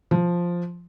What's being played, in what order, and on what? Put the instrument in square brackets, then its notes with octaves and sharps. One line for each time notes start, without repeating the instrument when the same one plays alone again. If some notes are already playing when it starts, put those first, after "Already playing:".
[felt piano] F3